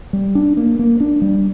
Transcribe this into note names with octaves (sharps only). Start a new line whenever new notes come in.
G3
D4
A#3
A#3
D4
G3